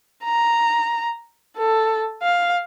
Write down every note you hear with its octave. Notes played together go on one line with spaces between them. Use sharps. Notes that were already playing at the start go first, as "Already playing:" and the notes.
A#5
A4
F5